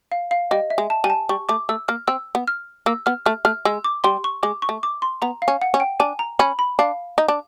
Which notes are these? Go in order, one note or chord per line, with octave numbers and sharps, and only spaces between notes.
F5
F5
G3 D#5
E5
G#3
A5
G3 G#5
A5
G3 C#6
A3 D6
A3 E6
A#3 F6
C4 E6
B3
F6
A#3 E6
B3 F6
A3 F6
A3 F6
G#3 E6
D6
G3 C6
C#6
G#3 D6
C#6
A3
D6
C6
B3 A#5
F5
C#4
F#5
C#4
G5
D4 G#5
A#5
C#4 B5
B5
D4 F5
D#4
D4